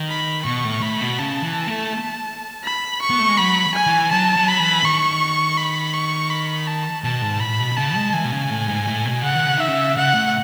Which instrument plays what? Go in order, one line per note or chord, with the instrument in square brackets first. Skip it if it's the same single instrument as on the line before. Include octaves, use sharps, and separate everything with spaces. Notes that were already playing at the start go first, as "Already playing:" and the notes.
Already playing: [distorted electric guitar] D#3
[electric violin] B5
[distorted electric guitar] B2 [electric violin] C#6
[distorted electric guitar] A2
[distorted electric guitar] A2 [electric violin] B5
[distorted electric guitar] B2
[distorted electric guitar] C#3 [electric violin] A5
[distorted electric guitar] E3
A3
[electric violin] B5
C#6
[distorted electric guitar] B3
A3
G#3
[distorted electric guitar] F#3 [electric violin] B5
[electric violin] G#5
[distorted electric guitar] E3
[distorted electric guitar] F#3 [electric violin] A5
[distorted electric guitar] F#3
[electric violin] B5
[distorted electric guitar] E3
[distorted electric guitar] D#3 [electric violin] C#6
[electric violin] B5
C#6
B5
A5
[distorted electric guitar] B2 [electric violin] A5
[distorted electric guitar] G#2
[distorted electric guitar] A2 [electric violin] B5
[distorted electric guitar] B2
B2
[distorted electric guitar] C#3 [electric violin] A5
[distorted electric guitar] G#3
[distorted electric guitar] E3 [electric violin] G#5
[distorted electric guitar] B2
C#3
A2
G#2
A2
B2
[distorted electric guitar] C#3 [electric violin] F#5
[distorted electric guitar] D#3
C#3
[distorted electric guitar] D#3 [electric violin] E5
[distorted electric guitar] C#3
[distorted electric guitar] C#3 [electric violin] F#5
[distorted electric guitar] A2